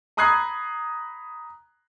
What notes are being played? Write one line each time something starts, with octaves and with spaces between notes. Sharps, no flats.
A#5 B5 D#6 F#6 G#6 C7